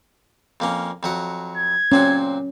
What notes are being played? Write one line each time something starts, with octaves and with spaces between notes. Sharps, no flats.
F2 A#3 C#4
F2 F#3 F#5
G#6
A#2 C4 C#4 F#4